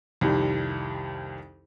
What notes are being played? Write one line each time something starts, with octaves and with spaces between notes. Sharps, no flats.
C2 F2 D#3 G3